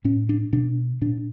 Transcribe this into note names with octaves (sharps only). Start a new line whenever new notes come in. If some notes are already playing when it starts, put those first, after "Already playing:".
A2 C#4
D4
B2 D4
A#2 D4